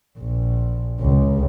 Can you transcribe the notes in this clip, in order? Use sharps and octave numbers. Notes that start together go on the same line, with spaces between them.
A#1
C#2